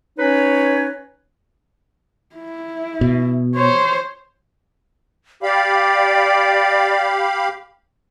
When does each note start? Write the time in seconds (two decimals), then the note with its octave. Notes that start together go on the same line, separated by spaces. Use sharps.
0.18 C#4 D#4 B4 C#5
2.35 E4
3.01 B2
3.56 C5 C#5
5.43 G4 D5 F5 B5